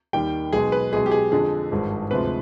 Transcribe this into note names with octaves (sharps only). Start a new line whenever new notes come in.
D#2 D#3 G3 G5
B1 B2 G#3 G#4
B4
B1 B2 G#3 G#4
G4
G#4
F2 D3 G#3 G#4
G#1 G2 F3 G#3
D2 C3 F3 G#3 B4